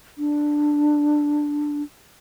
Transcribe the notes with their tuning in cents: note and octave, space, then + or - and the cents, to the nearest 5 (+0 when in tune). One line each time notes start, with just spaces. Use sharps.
D4 +5